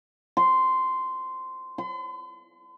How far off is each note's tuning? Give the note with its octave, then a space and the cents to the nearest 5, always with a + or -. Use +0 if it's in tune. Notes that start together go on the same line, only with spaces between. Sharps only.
C6 -10
C6 -45